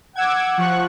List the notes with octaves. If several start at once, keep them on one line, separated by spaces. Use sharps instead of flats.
F#5 D6 E6 G#6
F3 C#6 F#6